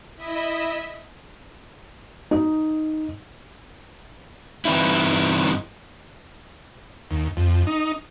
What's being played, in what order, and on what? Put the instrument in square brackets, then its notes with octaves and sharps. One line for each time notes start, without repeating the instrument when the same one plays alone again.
[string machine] E4 D#5 E5
[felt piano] D#4
[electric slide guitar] G2 E3 C4 D#4 E4
[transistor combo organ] D#2
F2
D#4